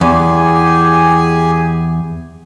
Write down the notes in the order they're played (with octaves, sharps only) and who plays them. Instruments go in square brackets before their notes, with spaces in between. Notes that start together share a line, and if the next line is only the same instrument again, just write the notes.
[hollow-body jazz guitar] E2 [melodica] G4 G#4 G#5